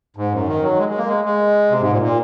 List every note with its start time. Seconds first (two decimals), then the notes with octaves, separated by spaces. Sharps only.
0.17 G#2
0.32 F#2
0.47 D#3
0.62 F#3
0.78 G#3
0.88 G#3
0.98 A#3
1.08 G#3
1.25 G#3
1.71 C3
1.81 G#2
1.91 A#2
2.02 A#2